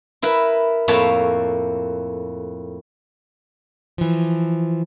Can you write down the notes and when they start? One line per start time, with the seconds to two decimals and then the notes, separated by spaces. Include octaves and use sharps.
0.22 E4 A#4 B4 E5
0.88 F2 A2 A#3 C#5 A5 B5
3.98 E3 F3